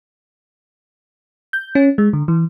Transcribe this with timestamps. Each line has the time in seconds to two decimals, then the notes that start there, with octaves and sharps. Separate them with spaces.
1.53 G6
1.75 C#4
1.98 G#3
2.13 D3
2.28 E3